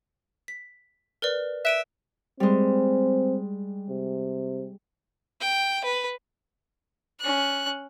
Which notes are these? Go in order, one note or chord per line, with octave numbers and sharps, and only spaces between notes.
B6
A#4 B4 D5
E5 F#6 D7 D#7
G3 G#3 C4
C3
G5
B4
C#4 F#6